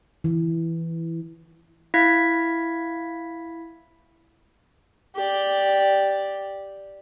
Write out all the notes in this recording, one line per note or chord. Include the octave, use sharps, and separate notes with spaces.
E3
E4 F5 G#6 B6
G4 D5